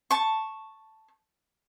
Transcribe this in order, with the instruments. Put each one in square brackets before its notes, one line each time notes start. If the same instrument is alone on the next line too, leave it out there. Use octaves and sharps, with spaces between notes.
[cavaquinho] A5 C#6